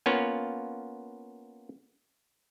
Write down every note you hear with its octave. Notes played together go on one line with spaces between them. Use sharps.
A#3 B3 C#4 F4